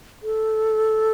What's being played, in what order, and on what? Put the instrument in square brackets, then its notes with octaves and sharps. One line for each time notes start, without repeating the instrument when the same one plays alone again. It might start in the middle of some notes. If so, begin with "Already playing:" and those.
[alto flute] A4